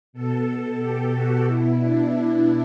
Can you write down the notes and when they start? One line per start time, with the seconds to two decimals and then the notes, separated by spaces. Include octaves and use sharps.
0.13 B2 A4
0.78 G4
1.12 F#4
1.44 B2 E4
1.77 D4
2.09 E4